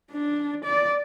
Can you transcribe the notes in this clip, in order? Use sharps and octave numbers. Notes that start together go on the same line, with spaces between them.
D4
D5